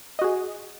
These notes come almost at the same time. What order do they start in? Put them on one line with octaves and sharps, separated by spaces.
D#5 F#4 G#4